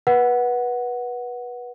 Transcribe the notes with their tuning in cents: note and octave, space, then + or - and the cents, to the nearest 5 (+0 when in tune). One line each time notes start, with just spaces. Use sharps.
B4 -20 F#5 +0